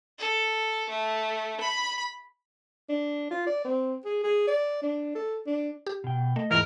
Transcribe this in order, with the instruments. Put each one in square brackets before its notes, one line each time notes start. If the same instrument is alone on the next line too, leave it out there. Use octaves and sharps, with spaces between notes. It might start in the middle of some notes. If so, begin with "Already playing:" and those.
[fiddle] A4
A3
B5
[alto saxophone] D4
F4
D5
C4
G#4
G#4
D5
D4
A4
D4
[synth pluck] G4
[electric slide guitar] B2 G5
[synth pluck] A3 [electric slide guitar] D#5
[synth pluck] E2 G#2 E3 [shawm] A#4